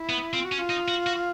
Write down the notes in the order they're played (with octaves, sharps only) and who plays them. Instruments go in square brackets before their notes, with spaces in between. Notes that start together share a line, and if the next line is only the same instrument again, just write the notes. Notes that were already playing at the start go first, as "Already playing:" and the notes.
Already playing: [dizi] E4
[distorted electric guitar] B3
[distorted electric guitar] C4 [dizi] F4
[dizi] F#4
[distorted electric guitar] C#4
[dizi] F#4
F4
[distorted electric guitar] D#4
F#4
F#4